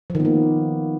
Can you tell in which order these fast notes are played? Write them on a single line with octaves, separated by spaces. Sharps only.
F3 D#3 B3 A#3